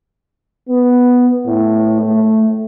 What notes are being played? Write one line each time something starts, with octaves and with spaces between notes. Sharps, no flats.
B3
A2
A3